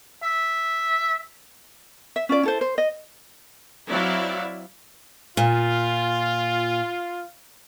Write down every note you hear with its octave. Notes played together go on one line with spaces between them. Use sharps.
E5
E5
C#4 F4 D5
E4 A4 C5
C5
D#5
F#3 C4 E4 D5 E5 F5
A#2 F4